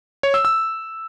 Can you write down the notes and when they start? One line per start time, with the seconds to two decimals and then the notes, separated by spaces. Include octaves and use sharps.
0.23 C#5
0.34 E6
0.45 E6